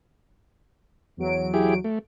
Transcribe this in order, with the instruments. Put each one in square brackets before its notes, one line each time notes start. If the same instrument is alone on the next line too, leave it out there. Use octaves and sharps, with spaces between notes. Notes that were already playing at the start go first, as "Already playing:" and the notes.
[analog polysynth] E2 F#3 D7
[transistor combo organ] E4 G4 G#4
A3